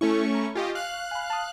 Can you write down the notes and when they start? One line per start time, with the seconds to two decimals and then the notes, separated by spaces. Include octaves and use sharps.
0.01 A3 C#4 E4 A4 C#6
0.34 A#5 B5
0.55 F4 G4 D#5 G#5 C#6
0.75 F5 F#6
1.11 G#5 B5
1.30 A5 D#6